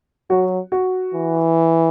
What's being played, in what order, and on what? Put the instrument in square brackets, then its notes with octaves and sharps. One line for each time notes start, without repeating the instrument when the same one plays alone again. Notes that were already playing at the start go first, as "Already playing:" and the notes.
[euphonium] F#3 [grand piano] F#4
[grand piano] F#4
[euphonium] E3